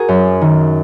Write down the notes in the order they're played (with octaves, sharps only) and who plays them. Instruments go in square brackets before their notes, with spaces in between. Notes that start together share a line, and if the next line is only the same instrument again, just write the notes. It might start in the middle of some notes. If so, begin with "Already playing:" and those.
Already playing: [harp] F#4 G#4 A#4
F#2
D#3